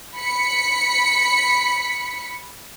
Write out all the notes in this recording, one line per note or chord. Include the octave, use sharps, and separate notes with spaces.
B5 B6 C#7